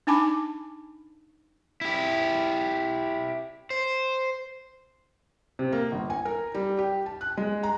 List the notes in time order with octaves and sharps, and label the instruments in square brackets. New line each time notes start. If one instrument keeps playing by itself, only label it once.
[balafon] D4 D#4 G#5 A5 B5 D6
[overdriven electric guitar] E4 G4
C5
[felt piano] C3
A#3
G1
G#5
A#4
G3
G4
A5
F#6
G#3
A#5